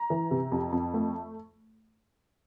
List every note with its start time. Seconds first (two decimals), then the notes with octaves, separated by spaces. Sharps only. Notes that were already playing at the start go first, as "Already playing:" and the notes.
Already playing: A#5
0.10 E3
0.31 C3
0.52 F2
0.72 F2
0.94 A3